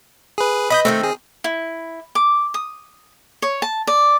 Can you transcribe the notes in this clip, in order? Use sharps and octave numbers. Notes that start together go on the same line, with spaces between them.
G#4 B4
B4 D#5 B5 D#6 G6
D#3 F#3 A3 C4
G#4
E4
D6
D#6
C#5
A5
D5